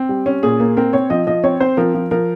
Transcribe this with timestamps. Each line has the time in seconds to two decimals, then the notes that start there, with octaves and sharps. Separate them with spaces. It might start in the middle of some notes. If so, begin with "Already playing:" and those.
Already playing: C4
0.09 G3
0.26 C#4
0.43 A#2 G#4
0.60 A#3
0.77 C4 A#4
0.93 C4 C#5
1.10 F3 D#5
1.27 F3 D#5
1.44 C4 C#5
1.60 C4 C5
1.77 F3 A#4
1.95 F3
2.11 F3 A#4